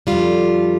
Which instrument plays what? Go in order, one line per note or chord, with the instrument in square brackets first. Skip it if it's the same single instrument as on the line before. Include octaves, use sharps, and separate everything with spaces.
[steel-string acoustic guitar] F2 D3 G3 F4